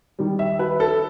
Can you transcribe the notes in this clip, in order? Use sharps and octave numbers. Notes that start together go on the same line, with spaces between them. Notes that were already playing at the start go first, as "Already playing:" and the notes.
D#3 G3
E5
B4
A4